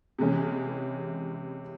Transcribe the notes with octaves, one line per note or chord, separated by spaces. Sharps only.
C3 E3 G#3 C#4